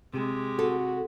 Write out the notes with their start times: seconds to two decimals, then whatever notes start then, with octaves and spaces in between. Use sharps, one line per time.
0.14 C3 G#3 G4
0.59 F#4 A4